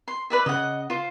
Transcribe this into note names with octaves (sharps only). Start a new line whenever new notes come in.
C6
B4 D5 E5
C#3 D#5 F#5
F4 C5